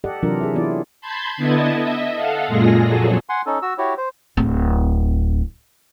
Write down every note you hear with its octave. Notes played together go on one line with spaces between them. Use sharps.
G4 A4 D5 D#5 F#5
C3 E3 F#3 D4 F4 A#4
G#4 E5
E3 B3 E4 F4 D5
A5 B5 C6 G6 G#6
D3 B3 E4 D#5 A5 G#6
D#5 E5
A4 F5 F#5
F#2 A#2 G#3 F4 G#4 A#6
F2 A#2 F#3 G#4 A4
F#5 G#5 C6
C#4 D#4 A4
F#4 E6
E4 F#4 G4 C#5
C5
D1 C4